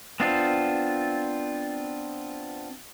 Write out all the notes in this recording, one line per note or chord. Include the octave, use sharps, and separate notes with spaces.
B3 C4 D4 F4